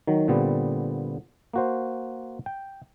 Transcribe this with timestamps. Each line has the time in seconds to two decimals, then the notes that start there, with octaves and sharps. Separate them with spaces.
0.07 D#3 F#3
0.28 A#2 D3 G3 B3 C4
1.53 A#3 F#4 C5
2.46 G5